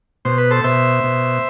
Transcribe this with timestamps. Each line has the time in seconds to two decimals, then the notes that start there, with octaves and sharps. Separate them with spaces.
0.25 B2 C5
0.38 B4
0.51 A4 C5
0.64 B2 C5 E5
1.03 B2